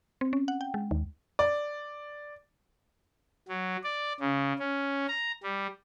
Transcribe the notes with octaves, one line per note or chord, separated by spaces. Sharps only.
C4
C#4
F#5
G5
G#3
D#2
D5
F#3
D5
C#3
C#4
A#5
G3